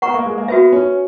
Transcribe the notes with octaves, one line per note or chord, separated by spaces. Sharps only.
B3 B4 F#5 A#5 C#6
A#3
G#3
A#3
B3 F#4 B4 E5
C#4